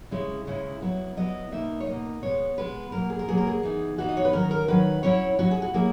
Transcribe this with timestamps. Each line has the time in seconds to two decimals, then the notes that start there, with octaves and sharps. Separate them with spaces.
0.11 C#3 G#3 C#4 E4
0.47 C#3 G#3 C#4 E4
0.82 F#3 B3 E4
1.17 F#3 B3 E4 D#5
1.52 B2 A#3 D#4 E5
1.80 C#5
1.87 B2 A#3 D#4 D#5
2.23 B2 G#3 B3 C#5
2.57 B2 G#3 B3 B4
2.92 B2 F#3 A#3 A#4
3.10 G#4
3.19 A#4
3.28 B2 F#3 A#3 G#4
3.38 A#4
3.47 G#4
3.63 E3 B3 D#4
3.98 E3 B3 D#4 F#4
4.09 D#5
4.17 C#5
4.25 B4
4.33 D#3 F#3 C#4 A#4
4.51 A#4
4.68 D#3 F#3 C#4 B4
5.03 F#3 C#4 E4 C#5
5.39 F#3 C#4 E4 F#4
5.51 G#4
5.62 F#4
5.74 F#3 A#3 E4 G#4